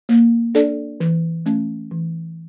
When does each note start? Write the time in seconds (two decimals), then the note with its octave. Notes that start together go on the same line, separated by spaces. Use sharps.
0.09 A#3
0.55 D4 A4 D5
1.00 E3
1.46 A3 C#4
1.91 E3